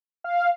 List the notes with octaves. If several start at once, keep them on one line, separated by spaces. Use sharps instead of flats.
F5